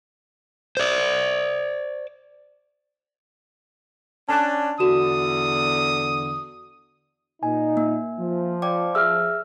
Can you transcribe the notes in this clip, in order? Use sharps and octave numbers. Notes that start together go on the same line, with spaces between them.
C5 D5
C#4 D4 A5 F#6
E2 D3 F#4 D#6 E7
A#2 D#4 G#5
A#3
F3
D5 G5 D6
G#4 E5 E6 F6